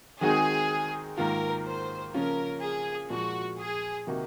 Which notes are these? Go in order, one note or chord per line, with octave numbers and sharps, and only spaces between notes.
D#3 G#3 C4 D#4 F#4 G#4
G#2 D#3 A#3 F4 A#4
C5
C#3 F3 A#3 C#4 F4 A#4
G#4
A#2 F3 G#3 F#4
G#4
C3 D#3 A#3 D#4 F#4